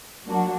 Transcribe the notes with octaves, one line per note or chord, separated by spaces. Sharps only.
F#3 A#3 D4 F#4